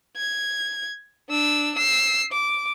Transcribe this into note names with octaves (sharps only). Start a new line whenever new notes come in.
G#6
D4 E6
E6 C7
D6